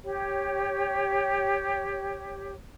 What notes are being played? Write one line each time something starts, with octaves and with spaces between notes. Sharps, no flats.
G4 C#5